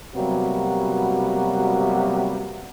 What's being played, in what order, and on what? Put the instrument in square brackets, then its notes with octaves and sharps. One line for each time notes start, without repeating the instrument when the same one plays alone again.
[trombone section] C3 F#3 G3 A#3 B3 F#4